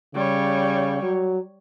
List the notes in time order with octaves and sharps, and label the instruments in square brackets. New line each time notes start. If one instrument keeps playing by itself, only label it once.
[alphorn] C#3 [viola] G3 C#5
[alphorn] F#3